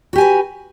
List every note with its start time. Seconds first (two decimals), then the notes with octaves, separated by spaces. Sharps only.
0.13 F#4
0.16 G4
0.18 G#5
0.21 B4